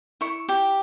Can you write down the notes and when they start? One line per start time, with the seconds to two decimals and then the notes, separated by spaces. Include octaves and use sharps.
0.21 E4 C#6
0.49 G4